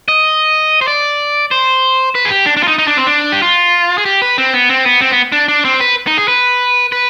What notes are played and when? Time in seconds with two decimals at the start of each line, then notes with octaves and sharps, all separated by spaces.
0.08 D#5
0.81 C5
0.88 D5
1.51 C5
2.15 B4
2.25 G#4
2.30 G4
2.46 D4
2.57 D4
2.63 F4
2.68 D#4
2.78 D#4
2.88 D4
2.97 C4
3.07 D4
3.32 G4
3.42 F4
3.98 G#4
4.05 G4
4.22 B4
4.38 C4
4.54 B3
4.69 C4
4.85 B3
5.01 C4
5.11 B3
5.32 D4
5.48 D4
5.65 C4
5.74 C5
5.81 B4
6.07 D#4
6.17 G#4
6.28 B4
6.92 B4